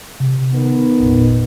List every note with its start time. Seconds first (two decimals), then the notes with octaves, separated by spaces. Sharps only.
0.20 C3
0.52 D#3 B3
1.00 G#1 E2 A#2